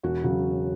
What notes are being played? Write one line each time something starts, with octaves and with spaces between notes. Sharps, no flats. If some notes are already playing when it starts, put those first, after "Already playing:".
E1 F#4
C#3 F#3